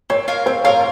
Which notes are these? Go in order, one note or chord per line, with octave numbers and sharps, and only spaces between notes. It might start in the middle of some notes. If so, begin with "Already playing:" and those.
C4 C#5
F4 A#4 F5
C4 C5
F4 A#4 C#5 F5